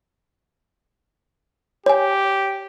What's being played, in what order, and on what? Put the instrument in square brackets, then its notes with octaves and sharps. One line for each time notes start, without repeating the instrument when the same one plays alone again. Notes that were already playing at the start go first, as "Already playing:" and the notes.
[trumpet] G4 [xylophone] C#5 G#5